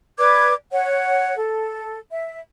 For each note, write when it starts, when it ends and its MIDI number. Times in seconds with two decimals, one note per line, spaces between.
0.18 0.53 71
0.18 0.53 74
0.18 0.53 86
0.18 0.53 92
0.72 1.35 73
0.72 1.35 78
1.36 1.99 69
2.12 2.40 76